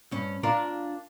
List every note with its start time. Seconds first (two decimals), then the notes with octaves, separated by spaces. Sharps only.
0.11 G2 C#4
0.43 D4 F4 A#4